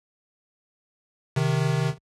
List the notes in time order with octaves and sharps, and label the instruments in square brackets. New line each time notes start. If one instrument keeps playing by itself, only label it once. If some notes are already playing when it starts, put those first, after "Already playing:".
[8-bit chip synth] C3 D#3